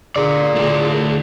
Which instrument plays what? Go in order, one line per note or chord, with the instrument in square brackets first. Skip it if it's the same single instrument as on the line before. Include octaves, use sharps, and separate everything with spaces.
[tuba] D3 [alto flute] G#4 [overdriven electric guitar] A#4 D5
[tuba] A2 [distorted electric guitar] D3 A3